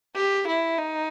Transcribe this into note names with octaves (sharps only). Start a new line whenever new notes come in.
G4
E4
D#4